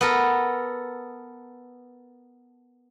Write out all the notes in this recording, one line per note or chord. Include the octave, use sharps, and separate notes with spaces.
B3 A4 A#4